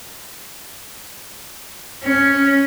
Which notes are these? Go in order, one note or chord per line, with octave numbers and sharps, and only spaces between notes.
C#4